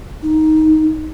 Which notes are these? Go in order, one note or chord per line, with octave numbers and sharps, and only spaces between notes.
D#4